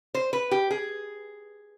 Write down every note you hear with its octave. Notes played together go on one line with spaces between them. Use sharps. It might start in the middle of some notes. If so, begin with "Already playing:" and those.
C5
B4
G4
G#4